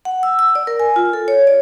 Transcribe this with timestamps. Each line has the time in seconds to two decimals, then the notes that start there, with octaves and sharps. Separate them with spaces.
0.05 F#5
0.23 E6
0.39 E6
0.55 D5
0.67 A#4
0.80 G#5
0.96 F4
1.13 A4
1.28 C#5
1.47 D5